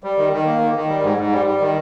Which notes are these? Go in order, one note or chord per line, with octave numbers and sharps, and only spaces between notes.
G3
D#3
D#3
A#3
D#3
D#3
G3
G#2
G#2
G3
G3
D#3